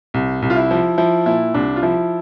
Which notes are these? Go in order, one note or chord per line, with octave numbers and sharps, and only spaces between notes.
C2
C2
F4
E4
F3
F3 E4
A#2 E4
C2 D4
F4
F3 E4